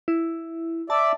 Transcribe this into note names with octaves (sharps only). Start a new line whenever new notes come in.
E4
D5 E5 A5